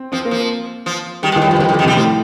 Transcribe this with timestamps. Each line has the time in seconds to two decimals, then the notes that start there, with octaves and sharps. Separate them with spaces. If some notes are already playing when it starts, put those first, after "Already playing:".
Already playing: C4
0.12 F3 C4
0.25 A#3
0.31 F3
0.86 F3
1.23 D#3 G3
1.32 A#2
1.36 D#3
1.42 A2
1.48 G2 F3
1.59 F2 D#3
1.69 G2
1.73 D3
1.79 D#3
1.85 C3 G3
1.97 A2 F3